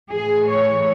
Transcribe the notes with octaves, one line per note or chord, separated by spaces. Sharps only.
A2 E3 G#4
C#5